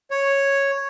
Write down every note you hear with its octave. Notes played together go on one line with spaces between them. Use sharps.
C#5